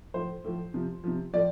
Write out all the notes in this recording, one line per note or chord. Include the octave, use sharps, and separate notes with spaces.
A2 F3 C5
A2 F3
C3 F3
C3 F3
A2 F3 D5